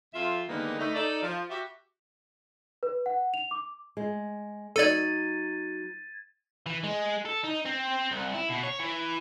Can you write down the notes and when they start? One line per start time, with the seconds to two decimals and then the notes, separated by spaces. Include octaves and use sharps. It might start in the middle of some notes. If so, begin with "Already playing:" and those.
0.14 F2 F4 E5
0.48 D3 D#3 G3 G#3 A#3 B3
0.79 D3 A3 D#4
0.94 D#4 A4 D5
1.22 F3
1.49 F#4 G4 E5
2.83 B4
3.06 F#5
3.34 F7
3.51 D6
3.97 G#3
4.76 F#3 D#4 A4 D5 G#6 A6 D#7
6.66 E3
6.84 G#3
7.25 A4
7.44 D#4
7.66 C4
8.11 C2
8.34 E4
8.49 B2
8.63 C#5
8.80 E3